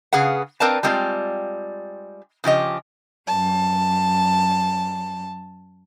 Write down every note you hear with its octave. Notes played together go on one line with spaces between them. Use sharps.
C#3 G#4 B4 F5 F#5
C4 A#4 B4 D5 F5 A5
G3 G#3 C4 F4 D5
C#3 F3 G4 D#5
F#2 A5